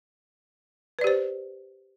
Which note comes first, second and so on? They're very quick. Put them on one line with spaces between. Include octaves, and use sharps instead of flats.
B4 D5 G4 C5